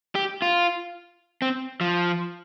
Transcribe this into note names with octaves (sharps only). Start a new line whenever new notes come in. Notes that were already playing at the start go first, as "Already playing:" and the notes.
G4
F4
C4
F3